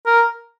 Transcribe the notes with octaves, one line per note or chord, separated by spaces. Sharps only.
A#4